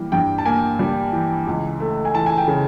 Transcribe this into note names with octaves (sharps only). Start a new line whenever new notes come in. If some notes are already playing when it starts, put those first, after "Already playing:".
Already playing: E3 G3 A#3
G2 G5
A5
A#3 G#5
G3
E3
C#2
A3
G#5
E3 A5
G#5
G5
C#3